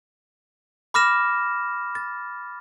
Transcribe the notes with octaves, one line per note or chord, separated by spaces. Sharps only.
B5 D6 F6 A#6 E7
A6